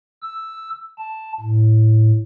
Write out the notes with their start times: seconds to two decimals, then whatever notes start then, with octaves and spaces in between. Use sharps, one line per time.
0.23 E6
0.98 A5
1.40 A2